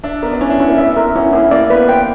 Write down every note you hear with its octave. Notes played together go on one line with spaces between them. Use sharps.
D4 E5
B3 A#4
D4
C#4 E4
D4
C#4 E4
A#3
B3 E5
A#4
C#4 E4
A#3 E4
A#3 D5
B3 B4
A#3 G5